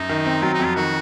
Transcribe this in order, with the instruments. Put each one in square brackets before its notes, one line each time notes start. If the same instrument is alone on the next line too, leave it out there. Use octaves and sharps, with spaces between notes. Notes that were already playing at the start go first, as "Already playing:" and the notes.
Already playing: [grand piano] F#2 [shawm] D#4
[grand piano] D#3
C4
[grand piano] F#3 [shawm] F4
[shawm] D#4
[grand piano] F2
[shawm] F4
[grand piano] D#3 [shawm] F#4